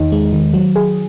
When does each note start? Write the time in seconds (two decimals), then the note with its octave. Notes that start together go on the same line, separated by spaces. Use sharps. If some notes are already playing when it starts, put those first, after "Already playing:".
Already playing: E2 D#3 D#4
0.12 G#3
0.33 D#3
0.54 F#3
0.76 G#4